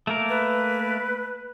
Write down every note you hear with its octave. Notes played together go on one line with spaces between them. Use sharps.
A3 A#3 A#4
B4